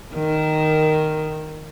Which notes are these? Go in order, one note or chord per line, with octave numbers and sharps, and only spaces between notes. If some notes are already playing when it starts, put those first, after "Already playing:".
D#3 A#4